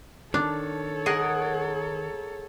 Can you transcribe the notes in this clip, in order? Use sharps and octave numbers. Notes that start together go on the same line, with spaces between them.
D#3 D4 A4 C#5
G#4 A#4 D#5 F#5